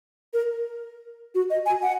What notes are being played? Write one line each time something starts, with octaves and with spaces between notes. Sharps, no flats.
A#4
F#4
D#5
G#5
F#5